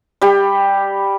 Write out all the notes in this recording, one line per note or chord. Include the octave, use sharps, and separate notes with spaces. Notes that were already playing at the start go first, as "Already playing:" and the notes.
G3 G4